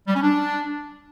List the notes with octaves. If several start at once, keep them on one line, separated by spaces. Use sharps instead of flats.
G3
C#4
D4